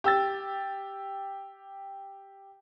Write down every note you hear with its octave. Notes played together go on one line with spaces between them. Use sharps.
G4 E6 A6